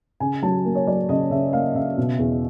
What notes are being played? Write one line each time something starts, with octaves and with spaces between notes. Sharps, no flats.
C#3 G#5
F#3 A5
A#3
C#5
F#3 D5
C#3 D#5
C#3 E5
A#3 F5
C#3 E5
B2
E2